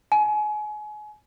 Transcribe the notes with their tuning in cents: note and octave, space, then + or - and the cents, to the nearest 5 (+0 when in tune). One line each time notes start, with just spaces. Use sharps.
G#5 +30